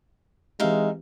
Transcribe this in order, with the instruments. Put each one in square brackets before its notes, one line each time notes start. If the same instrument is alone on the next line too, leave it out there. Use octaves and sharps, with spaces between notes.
[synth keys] E3 C4 G4 [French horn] G#3 [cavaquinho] D#4 E5 F5